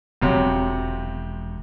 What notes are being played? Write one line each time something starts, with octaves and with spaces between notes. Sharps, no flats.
E1 F2 C3 F#3